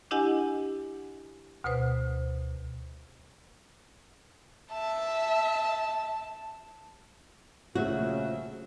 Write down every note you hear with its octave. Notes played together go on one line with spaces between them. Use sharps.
D4 E4 G4 D#5 F#5 G#5
D2 B2 B4 C5
E5 A5
A#1 C#3 F3 F#3 A3 F#4 E5